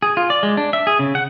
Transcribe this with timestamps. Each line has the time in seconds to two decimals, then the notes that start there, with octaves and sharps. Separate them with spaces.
0.02 G#4
0.17 F4
0.30 D5
0.43 G#3
0.57 D4
0.73 E5
0.87 G#4
0.99 C#3
1.15 F#5